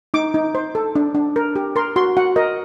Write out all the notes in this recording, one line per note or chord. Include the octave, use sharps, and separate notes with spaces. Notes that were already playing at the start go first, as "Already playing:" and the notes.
D#4 D6
D#4
C5
A4
D4
D4
A#4
G4
A#4 C6
F#4 C6
F#4 F#5
A#4 D#5